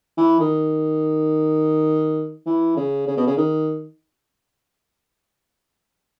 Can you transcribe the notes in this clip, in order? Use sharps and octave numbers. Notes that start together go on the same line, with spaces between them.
E3
D#3
E3
C#3
C#3
B2
C#3
D#3